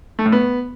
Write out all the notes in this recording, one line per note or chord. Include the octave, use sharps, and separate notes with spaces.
A3
A2
B3